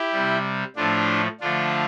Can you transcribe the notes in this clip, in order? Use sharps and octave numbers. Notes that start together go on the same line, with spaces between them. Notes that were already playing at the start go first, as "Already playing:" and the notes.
Already playing: E4 G4
C3 G3
A2 F3 A3 D4 F4
D3 F3 A3 D4 F4